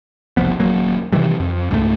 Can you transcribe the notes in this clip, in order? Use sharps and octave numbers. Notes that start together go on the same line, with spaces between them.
F#1 C2 F3 B3
D#1 F#3 A#3
C3 D#3 E3 G3
F2
C#2 G#2 F#3 A3